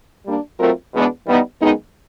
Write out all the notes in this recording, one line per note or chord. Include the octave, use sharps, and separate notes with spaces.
G3 A#3 D4
F#3 A3 C4 F4 A#4
E2 B2 G#3 B3 D4
E3 G3 B3 D#4
F#2 D#3 G#3 B3 D#4